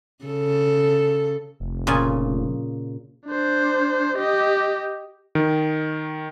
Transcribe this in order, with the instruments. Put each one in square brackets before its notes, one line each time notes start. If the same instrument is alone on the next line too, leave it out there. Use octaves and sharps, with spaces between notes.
[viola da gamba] C#3 A4
[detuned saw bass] F1
[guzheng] A#2 C#3 G#5
[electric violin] D4 C5
G4 D#5
[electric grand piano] D#3